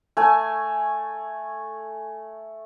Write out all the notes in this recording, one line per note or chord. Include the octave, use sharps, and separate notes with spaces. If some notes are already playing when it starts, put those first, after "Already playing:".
A3 G#5